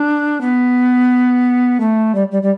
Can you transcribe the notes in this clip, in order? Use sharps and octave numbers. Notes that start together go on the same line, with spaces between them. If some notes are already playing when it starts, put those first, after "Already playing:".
Already playing: D4
B3
A3
G3
G3
G3